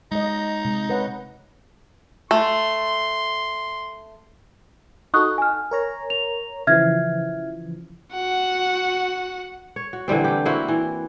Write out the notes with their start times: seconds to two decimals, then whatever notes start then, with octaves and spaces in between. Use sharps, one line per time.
0.12 G#3 D#4 D#5
0.65 C3 G#3
0.90 B4 C#5 F#5
2.31 A3 C6
5.14 D#4 F#4 A4 C#6 D#6 F#6
5.38 G#5 F6
5.71 A#4 C#5 A#5
6.10 F7
6.67 C#3 E3 F3 E5 F6 G#6
8.13 F#4 F#5
9.76 C#5
9.93 F#4
10.08 D3 E3 G3 C4
10.24 A3 G4
10.45 A#3 C4 E4 F#4
10.68 E3